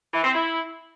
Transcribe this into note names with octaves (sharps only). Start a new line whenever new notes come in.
E3
C4
E4